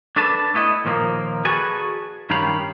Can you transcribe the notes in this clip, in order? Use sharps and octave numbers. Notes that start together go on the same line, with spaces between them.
D4 A4 B4 A5
A3 B3 E4 D#5
D#2 A#2 F3 G#3 A#3
F#4 G#4 A4 B4 D5 G#5
G2 D#3 C#4 G4 F5 B5